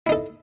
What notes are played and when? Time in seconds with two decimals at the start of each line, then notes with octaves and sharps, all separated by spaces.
0.07 E4
0.09 D#4
0.12 A4